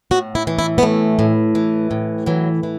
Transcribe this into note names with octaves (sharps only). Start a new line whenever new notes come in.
A2 F#4
E4
E3
E4
B3
A2 A3
A2
E3
A2
E3 F#3
E3